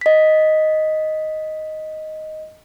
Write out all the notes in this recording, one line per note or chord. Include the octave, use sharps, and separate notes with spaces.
D#5 B6